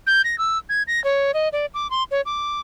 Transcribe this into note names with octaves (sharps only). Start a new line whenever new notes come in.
G6
A#6
E6
G#6
A#6
C#5
D#5
D5
D6
C6
C#5
D6